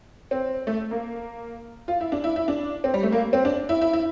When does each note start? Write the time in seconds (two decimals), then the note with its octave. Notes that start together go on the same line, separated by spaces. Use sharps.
0.31 C4
0.67 A3
0.91 A#3
1.88 F4
2.01 E4
2.12 D4
2.24 E4
2.36 E4
2.48 D4
2.84 C4
2.94 G3
3.03 A3
3.12 A#3
3.33 C4
3.45 D4
3.69 E4
3.81 E4
3.93 E4